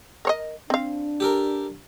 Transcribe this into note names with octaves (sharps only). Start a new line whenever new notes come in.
A#4 C#5 D#5
C4 D4 F5
G4 A4 A#4